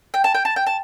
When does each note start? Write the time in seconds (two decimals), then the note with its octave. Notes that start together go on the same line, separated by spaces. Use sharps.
0.14 G5
0.24 A5
0.35 G5
0.45 A5
0.56 G5
0.66 A5